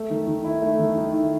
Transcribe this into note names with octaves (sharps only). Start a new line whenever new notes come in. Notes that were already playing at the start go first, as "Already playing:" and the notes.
Already playing: A3
D#3
D#3
E4
A3
D#3
D#3
E4